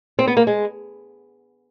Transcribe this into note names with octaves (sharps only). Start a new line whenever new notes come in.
C4
B3
A#3
G#3